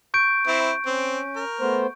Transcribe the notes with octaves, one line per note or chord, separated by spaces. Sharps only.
C#6 G6 D7
C4 E4
C4 C#4
A#4
A3 B3 C5